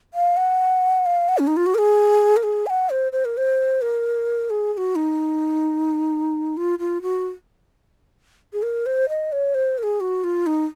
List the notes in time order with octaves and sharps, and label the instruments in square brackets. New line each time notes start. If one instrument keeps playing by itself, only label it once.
[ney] F5
F#5
F5
F#5
C#4
D#4
F4
F#4
A#4
G#4
A#4
G#4
G#5
F#5
C5
C5
A#4
C5
A#4
G#4
G#4
F#4
D#4
F4
F4
F#4
G#4
A#4
C5
D#5
C#5
C5
A#4
G#4
F#4
F4
D#4